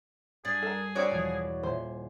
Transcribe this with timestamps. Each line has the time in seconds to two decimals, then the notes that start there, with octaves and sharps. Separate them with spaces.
0.45 G2 D4 G#4
0.62 A4 A#4
0.95 G3 C4 D4 F#4 C#5 D5
1.11 E1 E2 F3
1.63 D#1 C5 G#5 C6